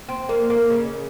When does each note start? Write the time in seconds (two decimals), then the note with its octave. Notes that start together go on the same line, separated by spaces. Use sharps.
0.09 C4
0.29 A#3
0.50 A#3
0.70 C#3